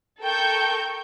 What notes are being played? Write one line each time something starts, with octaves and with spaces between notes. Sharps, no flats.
A4 A#4 G5 C#6 G6